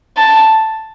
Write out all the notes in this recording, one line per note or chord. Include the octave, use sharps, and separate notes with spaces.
A5